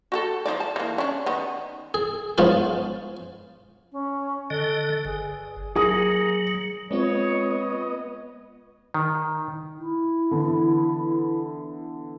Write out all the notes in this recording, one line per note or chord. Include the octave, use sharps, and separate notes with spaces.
F#4 G4 A4
F3 D#4 D5
A5
E3 A#3
C#4 D4
D#3 B3
G#4
G#2 F3 B3 C#4 F4 F#4
C#4
D3 A4 D#5
G1 G#4
F#3 A#3 G#4 D#6
G#3 B3 C4 F4 C#5 D#5
D#3
E4
D3 E3 B3